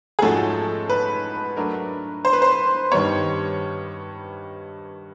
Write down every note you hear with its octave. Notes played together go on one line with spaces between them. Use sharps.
G#4
G#2 F3 A3 C#4 F#4 A4
B4
F#3 A3 D4 F#4 A#4
C5
B4
C5
G2 D#3 G3 B3 C#5